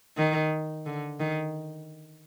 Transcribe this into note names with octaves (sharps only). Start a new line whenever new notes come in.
D#3
D3
D#3